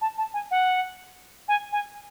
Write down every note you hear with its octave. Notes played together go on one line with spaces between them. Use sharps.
A5
A5
G#5
F#5
G#5
G#5